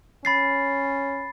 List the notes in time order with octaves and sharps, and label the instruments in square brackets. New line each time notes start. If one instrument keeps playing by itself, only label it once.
[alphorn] C#4 [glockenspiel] B5 A6 C7